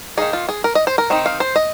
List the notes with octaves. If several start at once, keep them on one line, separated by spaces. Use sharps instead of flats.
D#3 A#3 D#4 G#4
F4
G#4
A#4
D#5
C5
A#4
D#3 C4 D#4
F5
C5
D#5